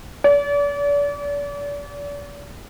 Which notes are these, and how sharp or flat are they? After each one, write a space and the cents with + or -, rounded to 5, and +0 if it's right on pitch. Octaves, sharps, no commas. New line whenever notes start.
D5 -40